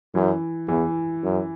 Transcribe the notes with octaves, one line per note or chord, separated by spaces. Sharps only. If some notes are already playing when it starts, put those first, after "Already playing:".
F#2 E3
E2 E3
F#2